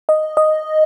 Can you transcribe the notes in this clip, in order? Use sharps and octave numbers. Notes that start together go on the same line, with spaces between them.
D#5
D#5